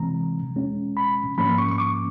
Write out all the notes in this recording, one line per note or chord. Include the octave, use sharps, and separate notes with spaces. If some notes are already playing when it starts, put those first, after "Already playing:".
Already playing: C3 E3 G#3 C4 A#5
E2 B2 G#3 C#4
B5
G#2 F3 A#3 C#4 B5
C#6
C#6
D6